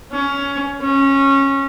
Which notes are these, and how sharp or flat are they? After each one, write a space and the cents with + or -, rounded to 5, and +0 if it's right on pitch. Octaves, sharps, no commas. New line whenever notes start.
C#4 +15
C#4 -15